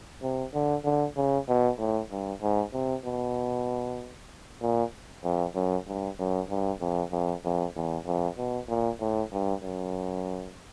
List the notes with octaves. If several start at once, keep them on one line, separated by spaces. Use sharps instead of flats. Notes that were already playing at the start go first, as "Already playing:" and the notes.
C3
D3
D3
C#3
B2
A2
G2
G#2
C3
B2
A#2
F2
F#2
G2
F#2
G2
F2
F2
F2
E2
F2
B2
A#2
A2
G2
F#2